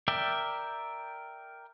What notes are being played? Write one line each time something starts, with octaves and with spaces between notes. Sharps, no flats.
A#4 D5 E5 G5